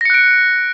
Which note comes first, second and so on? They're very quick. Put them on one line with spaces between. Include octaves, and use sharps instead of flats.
A#6 C#7 F#6 D7